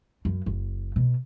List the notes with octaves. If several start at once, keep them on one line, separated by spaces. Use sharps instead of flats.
F#2
F#1
B2